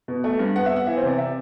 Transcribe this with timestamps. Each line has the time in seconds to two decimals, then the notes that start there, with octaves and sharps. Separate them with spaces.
0.08 B2
0.24 A3
0.39 G2
0.56 B3 F#5
0.66 E5
0.71 B3 F#5
0.87 E3 E5
0.97 C5
1.03 C3 D5
1.18 E5